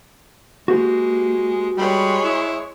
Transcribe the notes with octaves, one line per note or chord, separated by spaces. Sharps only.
G#3 A#3 F#4 G4 B4
G3 G#3 C#5 B5 C6
E4